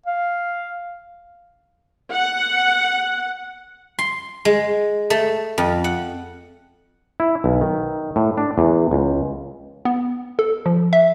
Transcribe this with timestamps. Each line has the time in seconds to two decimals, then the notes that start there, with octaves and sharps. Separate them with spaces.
0.06 F5
2.13 F#5
3.99 C6
4.45 G#3
5.10 A3
5.58 F2
5.84 F#5
7.20 E4
7.44 B1
7.61 D#3
8.16 A2
8.38 D4
8.58 E2
8.91 C#2
9.85 B3
10.39 A4
10.66 F3
10.93 E5